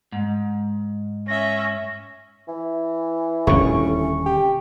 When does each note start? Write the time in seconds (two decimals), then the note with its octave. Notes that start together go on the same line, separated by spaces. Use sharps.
0.12 G#2
1.28 C#4 E5 A#6
2.48 E3
3.47 D#1 A2 D3 C#4 C#6
4.26 G4